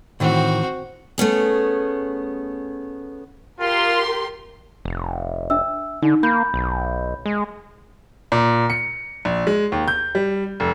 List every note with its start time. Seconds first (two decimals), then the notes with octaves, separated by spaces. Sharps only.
0.20 A2 D#3 E3 C4 F#4
1.18 A3 B3 C#4 G#4
3.60 F4 G4 A#4 C6
4.85 F1
5.50 D4 E5 E6
6.02 D3 D#4
6.23 A#3 B5 G6
6.54 B1
7.26 G#3
8.32 A#2
8.70 C#7
9.25 A#1
9.47 G#3
9.72 D#2
9.88 G6
10.15 G3
10.60 F1